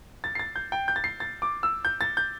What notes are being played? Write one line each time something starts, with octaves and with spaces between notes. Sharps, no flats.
A6
C7
A6
G6
G5
G6
A6
C7
A6
D6
E6
G6
A6
G6